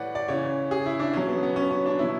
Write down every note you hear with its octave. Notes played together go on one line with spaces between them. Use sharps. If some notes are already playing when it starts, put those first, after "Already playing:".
Already playing: A2 E3 B4 C#5 D5 F#5
D5
C#3 E3 C#5
G#4
E4
D4
B2 F#3 C#4
B3
B3
C#4
C#4
D4
B2 F#3 E4